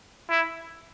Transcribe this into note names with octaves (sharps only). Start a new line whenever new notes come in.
E4